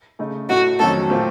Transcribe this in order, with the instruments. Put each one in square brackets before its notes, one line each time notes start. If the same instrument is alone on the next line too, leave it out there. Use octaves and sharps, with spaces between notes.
[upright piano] C#3 A3 D#4
[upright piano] A2 A3 D#4 [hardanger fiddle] F#4
[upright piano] F2 D#3 F#3 A3 C#4 [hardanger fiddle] A4
[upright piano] A#2 A3 C4 F4